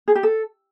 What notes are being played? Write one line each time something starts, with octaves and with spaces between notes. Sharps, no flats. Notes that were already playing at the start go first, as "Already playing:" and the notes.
G#4
G4
A4